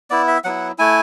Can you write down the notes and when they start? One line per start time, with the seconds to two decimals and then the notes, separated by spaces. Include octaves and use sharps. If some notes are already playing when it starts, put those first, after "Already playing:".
0.10 B3 E4 D5
0.28 E5
0.44 F#3 B3 E4 F#5
0.78 A3 E4 G#5